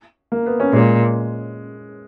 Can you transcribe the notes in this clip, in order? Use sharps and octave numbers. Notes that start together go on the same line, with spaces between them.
A#3
B3
C#4
A#2 G#3